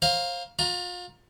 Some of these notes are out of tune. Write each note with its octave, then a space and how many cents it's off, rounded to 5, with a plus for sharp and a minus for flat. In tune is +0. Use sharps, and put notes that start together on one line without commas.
C5 +30 F5 +10 A#5 +25
F4 +35 A#5 +20